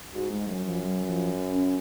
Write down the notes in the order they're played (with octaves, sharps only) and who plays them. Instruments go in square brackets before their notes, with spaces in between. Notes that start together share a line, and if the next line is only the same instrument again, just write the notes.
[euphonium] G#2 [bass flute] F#4
[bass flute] G#3
[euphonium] F#2 [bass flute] F#3
[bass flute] F3
F#3
F3
C#4